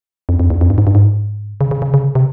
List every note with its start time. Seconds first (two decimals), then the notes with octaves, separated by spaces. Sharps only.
0.29 F2
0.40 F2
0.50 E2
0.61 F2
0.70 G2
0.78 G#2
0.87 G2
0.95 G#2
1.61 C#3
1.71 C#3
1.82 C#3
1.94 C#3
2.15 C3